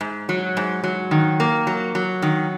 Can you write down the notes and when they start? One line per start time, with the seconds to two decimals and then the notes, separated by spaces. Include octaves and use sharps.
0.01 G#2
0.29 F#3
0.57 G#2
0.84 F#3
1.11 D#3
1.40 A#3
1.67 F#3
1.95 F#3
2.22 D#3